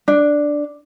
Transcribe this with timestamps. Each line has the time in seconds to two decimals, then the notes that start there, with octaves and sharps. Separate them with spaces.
0.08 D4